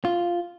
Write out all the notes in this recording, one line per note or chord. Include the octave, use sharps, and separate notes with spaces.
F4